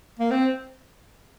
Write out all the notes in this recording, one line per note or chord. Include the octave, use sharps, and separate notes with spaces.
A#3
C4